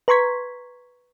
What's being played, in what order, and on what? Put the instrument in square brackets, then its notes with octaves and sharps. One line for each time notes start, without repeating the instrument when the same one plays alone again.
[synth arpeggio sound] B4 A#5 C6 C#6 G#6 B6